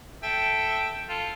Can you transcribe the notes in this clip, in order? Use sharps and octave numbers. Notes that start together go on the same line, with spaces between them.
A4 E5 G5
F4 A4